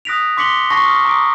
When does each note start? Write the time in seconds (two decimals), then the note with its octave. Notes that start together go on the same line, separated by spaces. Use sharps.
0.05 D#6 F#6 A#6 B6 D7 F7
0.37 C6 D6 B6 C#7 F#7 G7
0.70 A5 C#6 D6 A#6 C7
0.84 D#6 F6
1.05 A#5 D6 D#6 D7